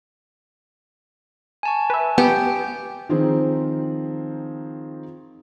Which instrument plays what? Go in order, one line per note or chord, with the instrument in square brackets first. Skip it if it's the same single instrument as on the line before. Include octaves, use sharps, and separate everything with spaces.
[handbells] G#5 A5 C#6
[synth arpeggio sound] B4 E5
[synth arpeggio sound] B3 [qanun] G4
[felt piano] D#3 F3 C4 D#4 G#4 C5